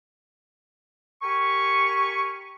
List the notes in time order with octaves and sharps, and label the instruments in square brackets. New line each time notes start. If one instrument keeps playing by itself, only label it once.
[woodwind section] G4 A#4 G#5 B5 C#6